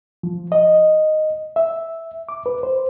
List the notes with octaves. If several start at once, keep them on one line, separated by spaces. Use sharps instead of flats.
F3
D#5
E5
D6
B4
C5